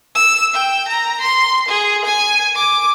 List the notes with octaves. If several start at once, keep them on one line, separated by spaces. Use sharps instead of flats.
E6
G5
A#5
C6
G#4
G#5
D6